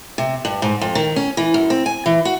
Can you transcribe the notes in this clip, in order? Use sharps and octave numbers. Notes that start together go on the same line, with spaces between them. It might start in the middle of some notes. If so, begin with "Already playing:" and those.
C3
G2
G#2
F2
D#3
C#4
E3
F#2
C4
G#5
E3
F#4